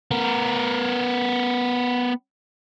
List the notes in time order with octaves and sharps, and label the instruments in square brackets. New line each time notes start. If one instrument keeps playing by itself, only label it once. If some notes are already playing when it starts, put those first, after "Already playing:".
[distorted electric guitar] B3 A#4